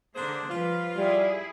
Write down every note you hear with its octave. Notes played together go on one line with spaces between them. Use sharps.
D3 A#3 D4 G#4 C5
F3 G3 F4 B4
G3 E4 G#4